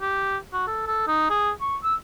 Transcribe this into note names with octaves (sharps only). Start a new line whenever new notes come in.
G4
F#4
A4
A4
D#4
G#4
C#6
E6